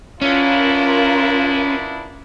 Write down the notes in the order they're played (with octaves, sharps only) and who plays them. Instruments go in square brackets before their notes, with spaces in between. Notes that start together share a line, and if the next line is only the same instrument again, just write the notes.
[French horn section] B3 D4 E4 [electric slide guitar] C#4 [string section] F4 A#4